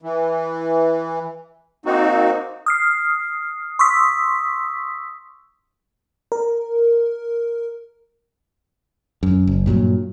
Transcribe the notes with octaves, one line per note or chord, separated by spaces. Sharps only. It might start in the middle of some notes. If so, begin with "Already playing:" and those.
E3
A#3 C4 D#4 F#4
D#6 F6 C7
C6 C#6 D#6 E6 B6
A#4
F#2
F#1
G2 A#2 F3 F#3